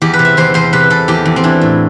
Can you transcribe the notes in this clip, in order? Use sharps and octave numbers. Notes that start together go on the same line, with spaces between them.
E2 G4
B4
C3
E5
E2 C5
E2 C5
C3 B4
C3 A4
E2 G4
E2
C4
E3 D4
A2